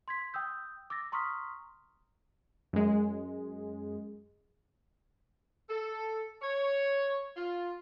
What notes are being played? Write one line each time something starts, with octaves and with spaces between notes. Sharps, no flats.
C6 G#6 B6
G5 D#6 E6 G6
D6 E6 A6 A#6
A#5 C6 C#6 D#6 F6 B6
F#2 G#3
A4
C#5
F4